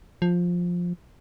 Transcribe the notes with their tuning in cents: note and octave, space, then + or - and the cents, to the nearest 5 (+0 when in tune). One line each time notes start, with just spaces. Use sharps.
F3 +10